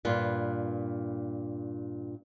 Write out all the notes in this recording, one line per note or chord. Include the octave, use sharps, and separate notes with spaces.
G2 A#2 F4 B4